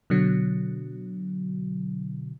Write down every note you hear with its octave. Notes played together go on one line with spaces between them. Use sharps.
B2 D3 F#3